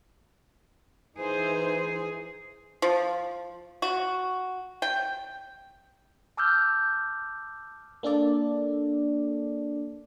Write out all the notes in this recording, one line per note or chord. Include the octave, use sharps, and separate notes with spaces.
E3 D#4 G#4 C5
F3
F#4
G5
A5 D6 E6 F6 G6
A#3 D4 A4 D5